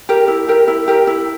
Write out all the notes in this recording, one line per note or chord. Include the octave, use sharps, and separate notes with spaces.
G4 A#4
E4
G4 A#4
E4
G4 A#4
E4